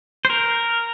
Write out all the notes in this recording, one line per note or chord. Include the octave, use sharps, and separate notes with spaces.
C5
A#4